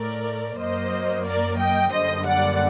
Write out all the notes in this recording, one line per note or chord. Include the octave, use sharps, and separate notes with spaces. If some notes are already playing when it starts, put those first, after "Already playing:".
Already playing: A2 A3 A#4 D5
F#2 F#3 A#3 C5 D#5
A#4 D5
D#5 G5
F#2 D3 G3 A#3 C5 D#5
D5 F#5